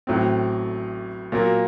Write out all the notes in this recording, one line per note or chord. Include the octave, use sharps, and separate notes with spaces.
A1 A2 F#3 C4
A#2 F#3 A#3